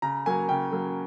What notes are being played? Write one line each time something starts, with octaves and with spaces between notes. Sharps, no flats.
C#3 A#5
F#3 A#3 G#5
C#3 G5
F#3 A#3